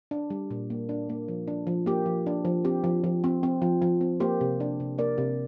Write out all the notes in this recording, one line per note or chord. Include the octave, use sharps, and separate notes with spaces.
D4
G3
A#2
A#3
D4
A#3
F3
D4
F3
A#3 G4
F3
D4
F3
C4 G4
F3
F3
C4
C4
F3
F3
C4
A#3 G4 C5
C3
D4
C3
A#3 A#4 D5
C3